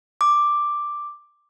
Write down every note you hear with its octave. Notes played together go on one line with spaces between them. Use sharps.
D6